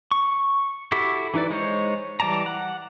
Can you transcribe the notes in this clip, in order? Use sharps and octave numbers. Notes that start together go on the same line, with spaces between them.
C#6
E4 F#4 G4 A4 B5
E3 D#4 E4 B4 D5
G#3 D#4 C5 C#5
E3 G3 D5 A5 A#5
F#5